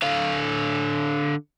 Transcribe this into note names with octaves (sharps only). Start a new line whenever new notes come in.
D3 F5